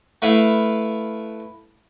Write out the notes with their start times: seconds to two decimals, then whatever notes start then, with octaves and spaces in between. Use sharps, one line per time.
0.22 A3 E4 B4 F5